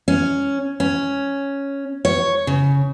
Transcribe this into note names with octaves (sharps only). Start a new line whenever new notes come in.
C#4
C#4
C#5
C#3